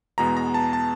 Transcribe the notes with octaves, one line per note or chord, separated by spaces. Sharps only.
E2 B2 G#3 B3 A#5
A#5
A5
A5